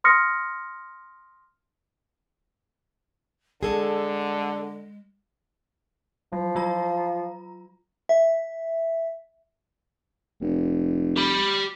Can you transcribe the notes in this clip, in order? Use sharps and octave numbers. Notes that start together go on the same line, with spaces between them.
C6 D#6 F6 A#6 C#7
D3 G#3 G#4 A4
F3 F#3
F#3 F4 A#5
E5
F1
G4 B5